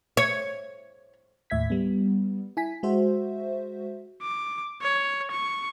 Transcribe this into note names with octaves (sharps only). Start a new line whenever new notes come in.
C#5
D#2 A2 E5 G#6 B6
G3 B3
E4 G#5 B6
G#3 F#4 C5 E5
D6
C#5
C#6